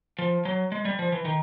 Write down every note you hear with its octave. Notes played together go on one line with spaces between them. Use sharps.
F3
F#3
G#3
G3
F3
E3
D#3